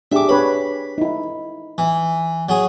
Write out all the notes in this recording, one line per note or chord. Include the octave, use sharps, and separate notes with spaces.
D4 G4 G#4 E5 D6
D4 B4 C#5 B5
D#4 E4
E3
F#3 G#4